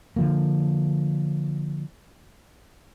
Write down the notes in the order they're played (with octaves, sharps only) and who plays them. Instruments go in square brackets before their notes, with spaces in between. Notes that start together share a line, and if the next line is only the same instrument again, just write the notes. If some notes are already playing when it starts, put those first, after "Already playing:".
[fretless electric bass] D3 F3 A#3